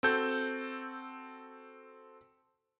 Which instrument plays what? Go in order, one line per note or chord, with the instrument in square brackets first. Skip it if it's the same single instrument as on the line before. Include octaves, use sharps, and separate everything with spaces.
[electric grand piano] C4 F#4 A4 G6